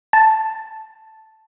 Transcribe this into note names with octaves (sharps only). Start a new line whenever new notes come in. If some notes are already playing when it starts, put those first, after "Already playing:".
A5